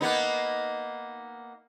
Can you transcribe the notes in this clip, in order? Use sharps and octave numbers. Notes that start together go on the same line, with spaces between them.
A#3 B3 D#4